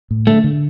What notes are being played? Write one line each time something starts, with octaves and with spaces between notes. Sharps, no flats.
A2
D3 A3
D3